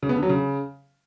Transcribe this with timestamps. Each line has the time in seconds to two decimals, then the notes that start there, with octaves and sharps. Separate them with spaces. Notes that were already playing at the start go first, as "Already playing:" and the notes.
0.03 C#3
0.09 B3
0.16 D3
0.23 F#3
0.29 C#3